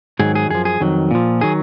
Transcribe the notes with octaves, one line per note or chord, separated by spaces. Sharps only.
G#2 D#3 F#3 G#4
G#4
F#2 F3 G#4
G#4
F2 D#3 F#3
A#2 F3
D#3 F#3 G#4